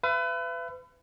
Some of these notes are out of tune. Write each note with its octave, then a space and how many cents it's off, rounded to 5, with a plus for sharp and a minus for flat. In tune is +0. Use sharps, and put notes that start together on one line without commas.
B4 +30 E5 +45